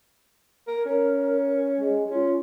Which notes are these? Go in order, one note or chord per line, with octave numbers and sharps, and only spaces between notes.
A#4
C#4 A#4
G#3
C#4 F4